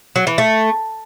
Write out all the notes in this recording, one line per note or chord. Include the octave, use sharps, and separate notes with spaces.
F#3
E3
A3